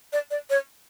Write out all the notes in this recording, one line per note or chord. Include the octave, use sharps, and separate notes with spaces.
D5
D5
C#5